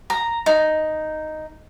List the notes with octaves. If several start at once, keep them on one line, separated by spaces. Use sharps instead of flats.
A#5
D#4